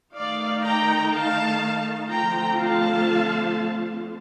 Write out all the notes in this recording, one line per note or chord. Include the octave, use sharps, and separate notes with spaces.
D#3 A3 D#4 D5 F5
G5 A#5
F5 A5
D3 F3 A3 C4 F4 G5 A#5
F5 A5